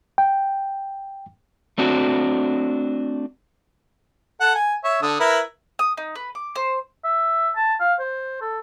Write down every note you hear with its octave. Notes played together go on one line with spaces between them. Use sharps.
G5
A3 C4 D4 F#4
A4 F#5
G#5
C#5 E5
D3 A5 D#6
E4 A#4 B4
D#6
D#4
B4
D6
C5
E5
A5
F5
C5
A4